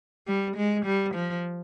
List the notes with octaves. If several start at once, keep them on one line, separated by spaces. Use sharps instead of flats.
G3
G#3
G3
F3